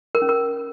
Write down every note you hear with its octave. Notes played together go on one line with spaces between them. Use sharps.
A#4
C#4
A#4